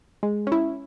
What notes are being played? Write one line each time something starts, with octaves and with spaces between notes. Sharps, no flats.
G#3
C#4 E4